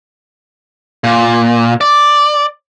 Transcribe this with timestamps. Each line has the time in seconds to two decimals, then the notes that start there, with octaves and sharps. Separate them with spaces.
1.04 A#2
1.81 D5